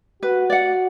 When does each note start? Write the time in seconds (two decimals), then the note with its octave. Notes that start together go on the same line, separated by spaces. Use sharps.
0.23 F#4 B4
0.50 D5 F#5